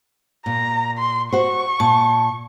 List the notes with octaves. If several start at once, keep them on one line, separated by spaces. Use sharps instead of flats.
A#2 A#5
C6
F#4 C5 C#6
A#2 A5